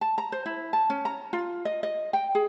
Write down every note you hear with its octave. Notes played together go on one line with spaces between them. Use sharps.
A5
A#5
C5
E4
A5
C#4
A#5
F4
D#5
D#5
G5
G#4